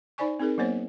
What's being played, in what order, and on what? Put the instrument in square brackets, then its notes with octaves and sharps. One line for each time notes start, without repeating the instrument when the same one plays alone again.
[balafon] D#4 C5 D5 G#5 C#6
C4 D#4 G#4 A#4
F#3 A#3 B3 C5 C#5